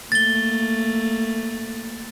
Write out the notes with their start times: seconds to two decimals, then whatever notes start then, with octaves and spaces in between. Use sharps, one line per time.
0.12 A3 A#3 A6 G7